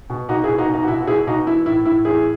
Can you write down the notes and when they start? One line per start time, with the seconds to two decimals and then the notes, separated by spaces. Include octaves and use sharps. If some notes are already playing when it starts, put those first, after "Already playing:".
0.10 B2
0.29 B2 D#4 F#4
0.44 E4 G#4
0.48 B2
0.58 D#4 F#4
0.69 B2 D#4
0.83 F#4
0.88 B2 E4
1.01 F#4
1.07 B2 E4 G#4
1.27 B2 D#4 F#4
1.46 E3 E4
1.66 A2 E4
1.85 A2 E4
2.05 E3 E4 G#4